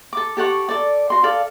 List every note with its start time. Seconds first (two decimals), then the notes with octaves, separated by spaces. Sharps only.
0.13 A4 D6
0.37 G4 A4 F#5 C#6
0.69 A4 D5
1.10 F#4 C6
1.23 A4 D5 F5